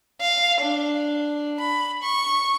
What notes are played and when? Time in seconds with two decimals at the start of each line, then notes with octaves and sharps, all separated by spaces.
0.21 F5
0.61 D4
1.60 B5
2.03 C#6